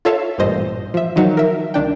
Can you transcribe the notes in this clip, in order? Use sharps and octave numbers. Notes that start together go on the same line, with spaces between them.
F4 A4 C#5 E5 F5 A5
A1 G2 A#2 C5 D#5
F3 E5
D#3 F3 F#3 D#4
A#4 E5
C2 D#3 D4 G5